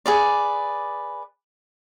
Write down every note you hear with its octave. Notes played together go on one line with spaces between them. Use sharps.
G#4 B4 D5